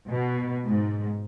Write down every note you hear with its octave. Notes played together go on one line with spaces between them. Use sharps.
B2
G#2